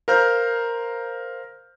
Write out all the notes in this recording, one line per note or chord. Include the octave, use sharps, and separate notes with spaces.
A#4 C5 F5 A#5 F6 G6